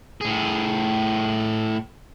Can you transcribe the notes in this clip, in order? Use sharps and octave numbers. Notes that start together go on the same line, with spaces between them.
A2 G#4